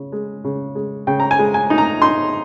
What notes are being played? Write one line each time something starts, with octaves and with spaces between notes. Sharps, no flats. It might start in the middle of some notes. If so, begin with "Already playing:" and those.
Already playing: C#3
G#3
C#3
G#3
C#3 G5
A#5
G#5
G#3
G#5
D#4
A#5
D#4 C6